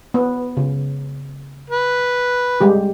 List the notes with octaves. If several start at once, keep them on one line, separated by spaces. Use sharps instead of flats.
B3
C#3
B4
G3 G#3 G4